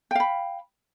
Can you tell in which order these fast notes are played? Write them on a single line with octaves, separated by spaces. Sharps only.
G5 F5 B5